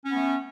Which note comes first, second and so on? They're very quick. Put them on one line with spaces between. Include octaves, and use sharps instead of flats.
C#4 B3 A3